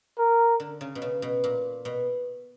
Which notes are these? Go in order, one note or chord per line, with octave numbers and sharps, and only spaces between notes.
A#4
D3
C#3
B2
C#3
B2
A#2
B2